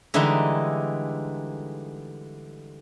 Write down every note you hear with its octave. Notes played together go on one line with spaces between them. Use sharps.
D3 E3 G3 G#3 D#4